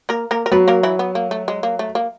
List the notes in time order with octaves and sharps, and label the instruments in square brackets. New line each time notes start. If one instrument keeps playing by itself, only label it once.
[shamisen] A#3 A#4
A#3 A#4
A#4
[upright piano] F#3 [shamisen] B3 B4
[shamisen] A#3 A#4
E3 E4
B3
A#3
A3
G#3
A#3
A3
A#3